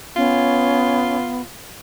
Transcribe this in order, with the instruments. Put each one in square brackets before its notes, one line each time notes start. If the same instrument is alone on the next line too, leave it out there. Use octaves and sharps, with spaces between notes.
[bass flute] B3 [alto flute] C#4 [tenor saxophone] F4